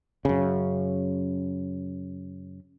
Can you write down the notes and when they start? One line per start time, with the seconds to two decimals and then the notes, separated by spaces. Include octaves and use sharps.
0.25 F#2 C#3